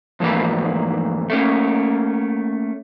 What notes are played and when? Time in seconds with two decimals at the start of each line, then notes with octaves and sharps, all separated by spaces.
0.20 F2 G#2 E3 A3 A#3 B4
1.30 A3 A#3 C#4